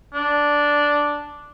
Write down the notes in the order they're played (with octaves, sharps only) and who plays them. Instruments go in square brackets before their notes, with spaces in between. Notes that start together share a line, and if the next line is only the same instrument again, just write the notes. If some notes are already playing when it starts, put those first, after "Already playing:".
[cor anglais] D4